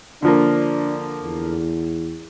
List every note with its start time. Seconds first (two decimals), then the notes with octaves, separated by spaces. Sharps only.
0.22 D3 F3 A#3 D4
1.23 E2